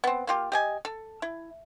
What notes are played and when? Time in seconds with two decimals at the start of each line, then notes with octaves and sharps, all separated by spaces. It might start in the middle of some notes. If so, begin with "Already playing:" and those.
0.04 B3 C4
0.27 A#3 F4 G4
0.52 G4 D#5 G#5
0.85 A4
1.22 E4